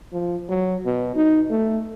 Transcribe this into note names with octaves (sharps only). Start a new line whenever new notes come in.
F3
F#3
B2
D#4
A3